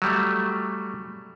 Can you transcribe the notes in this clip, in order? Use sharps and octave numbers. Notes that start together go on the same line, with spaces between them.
F#3 G3 A3